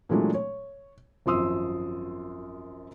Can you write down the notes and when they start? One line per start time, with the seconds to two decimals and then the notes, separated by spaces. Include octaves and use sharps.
0.09 A#2 E3 F#3 G#3 A3 D4
0.34 C#5
1.26 G#1 F#2 F3 C6 D#6 E6